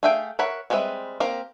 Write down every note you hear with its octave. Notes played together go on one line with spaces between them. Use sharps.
A3 G#4 E5 F5 G5
A#4 C#5 E5 F#5 B5
G3 G#3 C4 B4 E5
A#3 C4 G4 A#4 F5